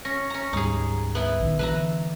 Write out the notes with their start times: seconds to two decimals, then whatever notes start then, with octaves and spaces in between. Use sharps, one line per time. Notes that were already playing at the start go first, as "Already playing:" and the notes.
0.05 C#4 A#6
0.30 C#4 A#5
0.53 D2 G#2 G3 D#4 G#4
1.15 B3 E4
1.40 A#1 D#3
1.59 D3 E3 B4 E5 A#5